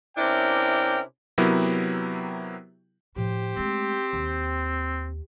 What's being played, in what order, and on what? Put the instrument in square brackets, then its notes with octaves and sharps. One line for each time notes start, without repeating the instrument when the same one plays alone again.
[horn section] C3 C#4 D4 E4 A#4 G5
[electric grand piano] C3 F#3 B3 E4 G4 A#4
[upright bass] A2 F3 [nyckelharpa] G4 C5
[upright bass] G#3 A3 [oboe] C4
[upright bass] D#2